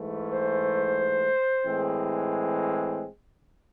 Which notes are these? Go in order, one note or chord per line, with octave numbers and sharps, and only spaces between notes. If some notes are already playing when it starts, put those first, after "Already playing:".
Already playing: G#2 E3 A3
C5
A2 E3 G#3 C4